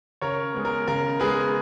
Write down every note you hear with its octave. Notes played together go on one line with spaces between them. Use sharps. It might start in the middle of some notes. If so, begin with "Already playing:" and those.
C#3 A#4 C#5
G#3 B3
A#4
C#3 A#4
G#3 B3 G#4 B4